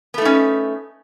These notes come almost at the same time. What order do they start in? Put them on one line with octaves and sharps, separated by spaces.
B3 A3 D#4 C#4